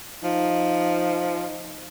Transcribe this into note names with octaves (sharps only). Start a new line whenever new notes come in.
F3 D#4